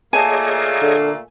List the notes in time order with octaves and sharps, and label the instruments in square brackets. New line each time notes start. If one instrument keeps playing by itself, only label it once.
[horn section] A#2 A3 A#3 [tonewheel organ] G#4 C#5 D#5 [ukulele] G#5 A5
[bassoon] D3